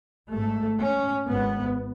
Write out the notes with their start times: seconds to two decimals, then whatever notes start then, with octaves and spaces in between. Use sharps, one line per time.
0.32 G#1 G#2 A3
0.80 C#4
1.28 G#1 G#2 B3